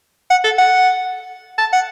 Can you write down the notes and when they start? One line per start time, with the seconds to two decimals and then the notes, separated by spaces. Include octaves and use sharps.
0.30 F#5
0.44 A4
0.58 F#5
1.58 A5
1.73 F#5